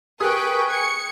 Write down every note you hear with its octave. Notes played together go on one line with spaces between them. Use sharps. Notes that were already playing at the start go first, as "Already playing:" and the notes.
G#4 A#4 B4 G5 C#6 D#6 F#6
G5 G#6 C#7